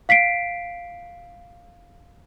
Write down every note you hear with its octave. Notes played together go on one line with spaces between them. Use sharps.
F5 B6 C7 D7